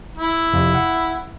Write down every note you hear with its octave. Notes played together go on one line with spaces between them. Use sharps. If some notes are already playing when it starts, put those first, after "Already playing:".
E4
F2 C3
F#5